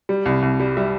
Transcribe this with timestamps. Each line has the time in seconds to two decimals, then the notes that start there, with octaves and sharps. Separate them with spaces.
0.09 G3
0.26 C2
0.42 C2
0.60 G3
0.77 G3 E5